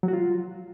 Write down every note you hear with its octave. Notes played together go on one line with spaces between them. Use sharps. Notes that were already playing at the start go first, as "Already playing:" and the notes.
F#3
F#4
F4